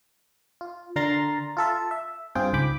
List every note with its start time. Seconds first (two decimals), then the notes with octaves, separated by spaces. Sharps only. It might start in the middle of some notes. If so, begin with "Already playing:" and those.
0.61 F4
0.96 D3 A#4 A#5 C6 A6
1.57 F4 A4 E5
1.91 E5
2.35 G2 C4 F4 G#4 G5
2.53 C#2 G#2 G5 B5 D6